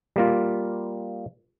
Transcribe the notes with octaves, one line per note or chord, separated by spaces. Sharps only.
G3 A#3 F4